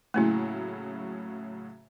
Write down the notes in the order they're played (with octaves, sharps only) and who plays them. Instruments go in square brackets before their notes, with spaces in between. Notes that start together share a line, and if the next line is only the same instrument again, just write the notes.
[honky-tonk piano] A2 C#3 F#3 [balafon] A3 A#3 E4